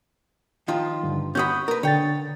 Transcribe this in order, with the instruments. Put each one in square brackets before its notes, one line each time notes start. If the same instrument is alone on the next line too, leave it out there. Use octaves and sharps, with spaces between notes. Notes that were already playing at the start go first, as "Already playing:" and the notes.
[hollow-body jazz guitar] D#3 F3 F4
[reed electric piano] G2 D3
[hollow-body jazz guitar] C#4 F#4 B5 [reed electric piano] D#6 G6
[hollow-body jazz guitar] A#4 B4
[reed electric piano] D3 A6 [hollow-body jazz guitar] C#5 G5